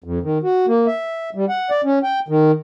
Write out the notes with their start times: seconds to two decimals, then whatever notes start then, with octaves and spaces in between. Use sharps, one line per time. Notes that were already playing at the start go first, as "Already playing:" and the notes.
0.04 F2
0.23 D#3
0.43 F#4
0.67 A#3
0.87 E5
1.35 G3
1.49 F#5
1.70 D5
1.84 C#4
2.03 G5
2.28 D#3